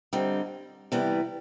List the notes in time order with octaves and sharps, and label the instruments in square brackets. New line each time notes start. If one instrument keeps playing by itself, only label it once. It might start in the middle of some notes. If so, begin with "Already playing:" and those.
[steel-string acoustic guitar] D3 G3 C4 D#4
C3 E3 G3 B3